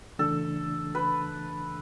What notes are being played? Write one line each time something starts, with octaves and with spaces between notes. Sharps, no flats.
C#3 E3 A3 D4 A4
B4